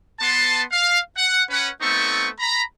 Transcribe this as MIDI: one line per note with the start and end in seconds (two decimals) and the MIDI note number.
0.20 0.62 59
0.20 0.62 81
0.20 0.62 84
0.71 0.98 77
1.16 1.42 78
1.50 1.69 61
1.50 1.69 71
1.50 1.69 78
1.81 2.29 57
1.81 2.29 59
1.81 2.29 60
1.81 2.29 63
1.81 2.29 69
1.81 2.29 85
2.38 2.61 82
2.38 2.61 83